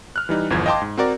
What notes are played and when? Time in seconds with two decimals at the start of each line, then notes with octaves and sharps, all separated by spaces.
0.16 F6 F#6
0.29 E3 G3 D#4
0.50 G1 E2 F3 G#6
0.66 D#5 F5 G5 A5 C6 D6
0.82 G#2
0.97 C4 F#4 A#4 D5